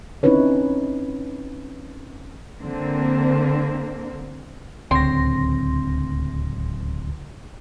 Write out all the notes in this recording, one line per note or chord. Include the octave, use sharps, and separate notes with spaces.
C4 C#4 D#4 E4 B4 C#5
D3 A#3 C4
D1 C#2 D3 C4 C#5 G5 C6 A#6